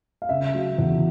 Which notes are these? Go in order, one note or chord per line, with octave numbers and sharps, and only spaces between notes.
F5
C#3 E5
F#3
E2